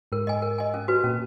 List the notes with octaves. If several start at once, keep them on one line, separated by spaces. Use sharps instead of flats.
G#2 A#4
D#5 G#5
A#4
D#5 G#5
C#4
F#4 B4
A#2 C#4